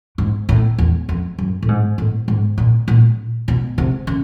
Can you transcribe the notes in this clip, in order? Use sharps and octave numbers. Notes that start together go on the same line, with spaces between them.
G#2
A2
E2
F2
F#2
A2
G#2
A2
G#2
A#2
A#2
B2
C3
C#3